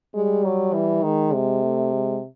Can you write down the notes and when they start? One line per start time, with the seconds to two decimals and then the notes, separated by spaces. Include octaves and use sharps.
0.14 G3 G#3
0.45 F#3
0.74 E3
1.03 D#3 G#3
1.33 C3
1.63 A3
1.93 G#3